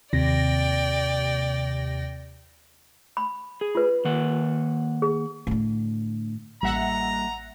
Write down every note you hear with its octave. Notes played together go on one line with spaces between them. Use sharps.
D#2 C3 D5 G5 A#6
B5
G#4
F4 B4
D#3 A#3 F#5
G#4
A2 D3
A1 G3 A#3 E5 F#5 A#5